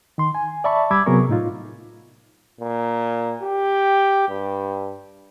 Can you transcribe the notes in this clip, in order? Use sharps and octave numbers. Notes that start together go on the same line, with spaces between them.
D#3 C6
G#5
D5 E5 A5 B5 C#6
G3 B5 D6 E6 G#6
C3 F#3 B3 G#4 A#4 C#6
A2 D#4 F4
A#2
G4
G2